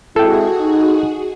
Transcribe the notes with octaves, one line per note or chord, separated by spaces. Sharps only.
G#3 C4 E4 F#4 G#4 A4 G5
D#4